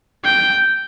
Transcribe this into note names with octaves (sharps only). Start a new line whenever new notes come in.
G5